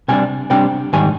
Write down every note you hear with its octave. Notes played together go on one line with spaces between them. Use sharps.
C3 G3 D4 G#5
C3 G3 D4 G5
G#2 D#3 G3 G#5